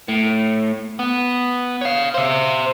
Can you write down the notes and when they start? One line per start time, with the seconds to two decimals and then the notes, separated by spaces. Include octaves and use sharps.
0.09 A2
0.99 B3
1.81 C#5 F5
2.14 C5 E5